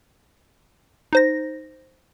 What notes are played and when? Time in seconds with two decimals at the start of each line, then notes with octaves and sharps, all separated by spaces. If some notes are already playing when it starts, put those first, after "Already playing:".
1.13 D#4 C5 A#6